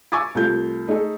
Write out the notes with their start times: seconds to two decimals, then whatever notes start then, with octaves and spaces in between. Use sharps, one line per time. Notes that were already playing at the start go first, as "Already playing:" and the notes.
0.12 G#5 C#6 D6 E6 G#6 A6
0.35 C2 A3 F4 G6
0.88 A3 D#4 G#4 A4